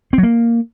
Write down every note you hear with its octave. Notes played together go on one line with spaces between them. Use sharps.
C4
F#3
A#3